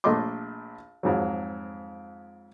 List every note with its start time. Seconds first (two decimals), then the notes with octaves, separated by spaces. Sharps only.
0.04 A#1 A3 A#3 D#5 C6 D6
1.03 F2 G#2 F#3